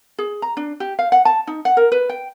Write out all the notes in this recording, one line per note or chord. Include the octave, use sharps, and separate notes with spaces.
G#4
A#5
D4
G4
F5
F#5
A5
D#4
F#5
A#4
B4
G5